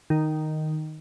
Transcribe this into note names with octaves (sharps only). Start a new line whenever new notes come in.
D#3